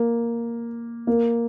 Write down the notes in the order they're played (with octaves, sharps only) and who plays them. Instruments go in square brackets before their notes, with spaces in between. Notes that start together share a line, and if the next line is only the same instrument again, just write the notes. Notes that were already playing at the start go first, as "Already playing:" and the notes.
Already playing: [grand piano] A#3
A#3